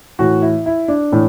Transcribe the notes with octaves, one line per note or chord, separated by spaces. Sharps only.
A2 E3 F#4
E4
E4
D4
A2 E3